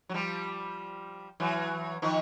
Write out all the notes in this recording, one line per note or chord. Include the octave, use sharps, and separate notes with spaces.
F#3
F3 G3
E3 F#3
D#3 F3